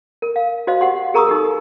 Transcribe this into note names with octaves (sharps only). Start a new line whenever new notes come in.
A#4
F5
F#4 C5 D#5 F5
G4 F#5 C6
G#4 A#4 A#5 C#6 D#6 E6
D#4 G4 A4